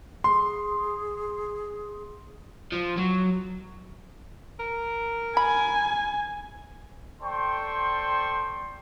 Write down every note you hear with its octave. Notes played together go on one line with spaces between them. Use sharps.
G#4 C6
F3
F#3
A#4
G#5 B5
A4 C5 D5 G5 C6 C#6